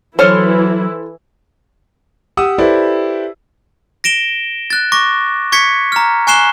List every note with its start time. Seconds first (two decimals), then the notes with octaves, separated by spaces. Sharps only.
0.19 E3 F#3 E4 A4 C5 C#5 C6 F6
2.37 G4 F#5 D#6 E6
2.58 E4 G4 A4 B4 C5 D5
4.04 A#6 D7 E7 G7
4.70 F#6 A6
4.92 C#6 D6 A#6
5.52 C#6 G#6 B6 C#7
5.92 A#5 F6
6.27 G#5 C#6 F#6 C7 E7 G7